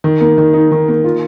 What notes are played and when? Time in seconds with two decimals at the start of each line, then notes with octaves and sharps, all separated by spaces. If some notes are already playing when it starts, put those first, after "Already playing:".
0.04 D#3
0.21 A#3
0.38 D#3
0.54 D#4
0.71 D#3
0.88 A#3
1.04 F4